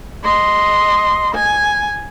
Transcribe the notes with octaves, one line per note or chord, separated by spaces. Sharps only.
D#5 C6
G#5